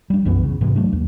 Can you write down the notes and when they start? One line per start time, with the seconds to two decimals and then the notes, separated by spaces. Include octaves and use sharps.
0.10 G3 D4
0.25 B1 F#2 E3 B3
0.43 C#3
0.61 G#2 C3 E3 G#3
0.76 F#3 A3 D4
0.93 D#2